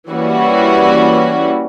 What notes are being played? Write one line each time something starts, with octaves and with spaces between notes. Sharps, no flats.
E3 G3 A#3 C#4 F#4